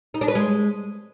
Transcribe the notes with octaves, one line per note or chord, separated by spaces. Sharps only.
D#4
D4
B4
G#3